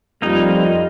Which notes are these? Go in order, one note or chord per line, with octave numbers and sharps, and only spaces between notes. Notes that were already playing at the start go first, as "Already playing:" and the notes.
F2 G3 A#3 D#4 F4 D#5